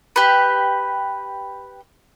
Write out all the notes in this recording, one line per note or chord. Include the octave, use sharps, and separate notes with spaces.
G4 B4